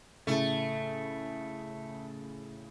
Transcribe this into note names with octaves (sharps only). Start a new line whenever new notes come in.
A2 C#3 A3